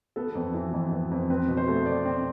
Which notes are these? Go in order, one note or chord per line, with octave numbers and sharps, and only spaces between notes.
B3 A4
F2
E3
F2
B3
F2
C4 B4
B2
C5
A3
B2 D5
C4